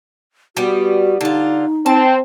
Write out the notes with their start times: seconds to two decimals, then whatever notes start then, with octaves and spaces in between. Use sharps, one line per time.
0.57 G3 B3 F#4
1.21 D3 D#4 F4
1.86 C4 A5